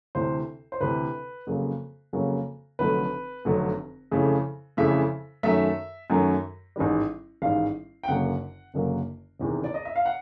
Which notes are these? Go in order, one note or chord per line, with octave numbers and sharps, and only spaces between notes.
D2 C3 E3 A3 C5
C5
D2 C3 E3 A3 B4
F2 C#3 F#3 A#3
F2 C#3 F#3 A#3
F1 F2 D3 F#3 A3 B4
F1 F2 D3 F#3 A3
F2 C#3 E3 A3
F2 C#3 E3 A3 E5
F#2 D#3 F#3 A3 E5
F#2 D#3 F#3 A3
A1 G#2 D#3 G3
A1 G#2 D#3 G3 F5
G5
F#1 F#2 D3 F#3 A#3 F#5
F#1 F#2 D3 F#3 A#3
E1 E2 C3 D#3
D5
D#5
E5
F5
F#5